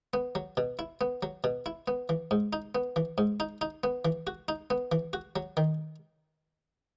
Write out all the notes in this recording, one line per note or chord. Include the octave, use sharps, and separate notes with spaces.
B3
F#3
B2
E4
B3
F#3
B2
E4
B3
E3
G#2
D#4
B3
E3
G#2
D#4
D#4
B3
E3
F#4
D#4
B3
E3
F#4
F#3
D#3